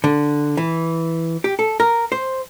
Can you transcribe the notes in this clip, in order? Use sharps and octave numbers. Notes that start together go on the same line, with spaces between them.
D3
E3
G4
A4
A#4
C5